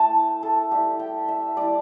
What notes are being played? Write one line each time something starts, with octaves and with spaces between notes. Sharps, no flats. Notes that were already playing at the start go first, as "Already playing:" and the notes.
Already playing: A3 E4 G5 A5
A4
G3 E4 G4
G5
E5
G3 E4 D5